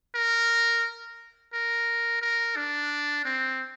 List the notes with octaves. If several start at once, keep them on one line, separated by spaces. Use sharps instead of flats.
A#4
A#4
A#4
D4
C4